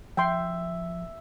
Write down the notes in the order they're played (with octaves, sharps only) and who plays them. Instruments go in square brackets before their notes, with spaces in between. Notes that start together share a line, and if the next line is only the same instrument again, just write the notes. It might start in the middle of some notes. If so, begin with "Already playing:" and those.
[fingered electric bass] F3 [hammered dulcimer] E5 [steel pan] G5 C6